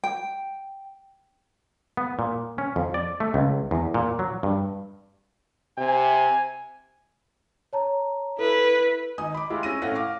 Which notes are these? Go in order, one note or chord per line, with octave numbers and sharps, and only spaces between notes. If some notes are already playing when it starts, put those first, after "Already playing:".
G5
B3
A#2
C#4
F2
D5
A3
C#2
E2
A#2
F#3
G2
C3 G#5
C#5 A5 A#5
E4 A4 B4
G#1 D#4 G#5 D#6
B5 D6
G#3 E4 F4 G4
C#4 E6 A#6 D#7
A2 A3 C#4 F5 F#5 A#6
F5 D6